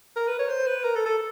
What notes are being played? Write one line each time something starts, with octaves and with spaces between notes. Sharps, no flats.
A#4
B4
C#5
C5
B4
A#4
A4
A4